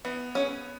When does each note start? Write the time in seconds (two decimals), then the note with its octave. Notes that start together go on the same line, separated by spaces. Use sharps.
0.05 E3 B3
0.35 C#4 G#4